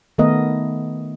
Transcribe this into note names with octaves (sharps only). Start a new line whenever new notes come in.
D#3 A3 B3 A#4 D#5